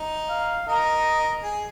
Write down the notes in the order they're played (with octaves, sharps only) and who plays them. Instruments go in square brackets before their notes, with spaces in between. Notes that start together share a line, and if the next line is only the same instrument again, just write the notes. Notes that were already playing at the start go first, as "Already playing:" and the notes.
Already playing: [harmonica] D#4
[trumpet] F5
[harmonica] A#4 [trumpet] D#5
[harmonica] G#4